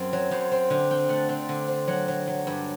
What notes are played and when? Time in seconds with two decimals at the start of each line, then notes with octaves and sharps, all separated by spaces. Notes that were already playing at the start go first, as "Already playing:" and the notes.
Already playing: F#2 C4
0.13 F#3
0.31 F#2 C5
0.51 C4 C5
0.70 D3 G5
0.90 C4 G5
1.09 A3 F#5
1.29 C4
1.49 D3
1.68 C4
1.87 F#3 F#5
2.08 F#3
2.27 F#3
2.47 G2